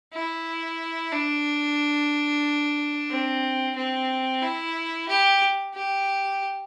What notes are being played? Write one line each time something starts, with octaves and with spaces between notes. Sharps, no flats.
E4
D4
C4
C4
E4
G4
G4